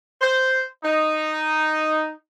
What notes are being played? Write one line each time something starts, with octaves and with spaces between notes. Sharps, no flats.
C5
D#4